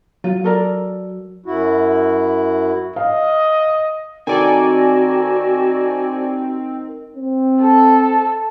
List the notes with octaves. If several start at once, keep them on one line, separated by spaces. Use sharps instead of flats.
F#3 F4
A4 A#4 D5
F#2 E4 F#4
D#5 F5
D#3 C4 F#4 A4 D5 G#5
C4
A4